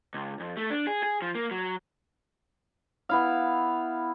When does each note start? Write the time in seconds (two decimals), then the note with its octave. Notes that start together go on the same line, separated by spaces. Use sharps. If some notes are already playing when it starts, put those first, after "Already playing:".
0.14 C#2
0.40 F2
0.57 A3
0.70 D4
0.87 G#4
1.03 G#4
1.22 F3
1.35 A#3
1.51 F#3
3.09 B3 E4 F5